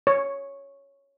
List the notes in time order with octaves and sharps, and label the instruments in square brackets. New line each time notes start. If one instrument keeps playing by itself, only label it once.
[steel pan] C#5